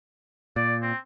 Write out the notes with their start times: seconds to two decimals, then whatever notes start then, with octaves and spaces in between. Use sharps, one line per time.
0.56 A#2 D5
0.82 C4